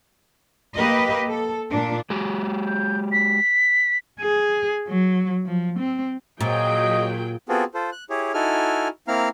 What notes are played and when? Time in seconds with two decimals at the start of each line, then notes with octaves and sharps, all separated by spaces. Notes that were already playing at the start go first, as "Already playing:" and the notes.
0.76 A#3 G4 B4 D#5
1.29 A4
1.69 A#2 D4
2.10 G#3 F#4 G4
2.66 G6
3.12 B6
4.20 G#4
4.88 F#3
5.46 F3
5.79 C4
6.41 A#2 F#3 G#4 D#5 G5
7.49 B3 C4 F4 F#4 G#4 A4
7.74 F4 A4 C5
7.92 F#6
8.10 E4 G4 G#4 C#5
8.34 D#4 E4 F#4 A4 G#5 F6
9.08 A#3 C4 E4 F5 A#5 F6